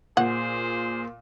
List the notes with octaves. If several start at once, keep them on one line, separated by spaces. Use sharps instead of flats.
A#2 G#4 C5 F#5